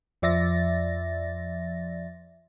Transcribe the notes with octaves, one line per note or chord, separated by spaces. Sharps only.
F2 F3 D5 E5 A6 A#6